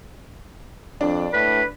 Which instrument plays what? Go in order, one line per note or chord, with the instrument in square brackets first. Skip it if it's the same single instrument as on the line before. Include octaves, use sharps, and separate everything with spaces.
[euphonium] F2 [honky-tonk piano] D4
[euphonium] A2 [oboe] B4